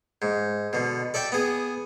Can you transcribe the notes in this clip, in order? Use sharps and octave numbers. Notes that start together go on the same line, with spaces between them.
G#2
B2 D3
A4 D5 E5 G5
B3 G#4